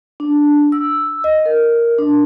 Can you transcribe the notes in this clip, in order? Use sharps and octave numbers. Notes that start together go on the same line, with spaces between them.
D4
E6
D#5
A#4
D4